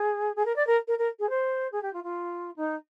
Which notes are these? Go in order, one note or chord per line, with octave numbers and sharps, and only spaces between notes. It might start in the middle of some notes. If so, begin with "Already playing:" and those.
Already playing: G#4
G#4
A#4
D5
A#4
A#4
A#4
G#4
C5
G#4
G4
F4
F4
D#4